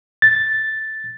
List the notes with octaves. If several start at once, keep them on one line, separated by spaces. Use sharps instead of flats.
A6